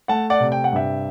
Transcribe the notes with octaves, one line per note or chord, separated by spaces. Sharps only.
A3 F#5 A5
D5 F#5
C3
G5
F#5
G2 E5 G5